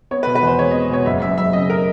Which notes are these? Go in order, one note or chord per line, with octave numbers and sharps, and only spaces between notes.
B3 C#5
B4
B2
B4
E2 C5
G#3 C#5
D#5
B3
B2 C#5
F#1 E5
F#2 E5
F#1 E5
C#3 D#5
A#4